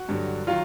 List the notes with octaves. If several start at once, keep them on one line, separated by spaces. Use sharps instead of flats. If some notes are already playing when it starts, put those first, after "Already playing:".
Already playing: F#4 F#5
G2 D3 F#3
D#3 F#3 F4 F5